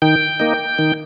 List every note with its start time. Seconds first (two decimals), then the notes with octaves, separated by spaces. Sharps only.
0.02 D#3 G5
0.40 A#3 D#4
0.79 D#3